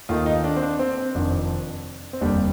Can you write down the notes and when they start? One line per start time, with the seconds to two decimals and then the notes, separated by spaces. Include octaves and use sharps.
0.09 D#2 D#3 A3 F4
0.26 D#4
0.44 D4
0.56 C4
0.62 D4
0.79 C4
0.97 C4
1.14 F1 F2 D#3 D4
2.13 C4
2.21 F1 D#2 D3 G3 D4